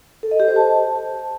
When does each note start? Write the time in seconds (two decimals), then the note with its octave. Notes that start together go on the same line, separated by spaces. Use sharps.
0.23 A4
0.31 D#5
0.40 G4
0.48 C5
0.56 A5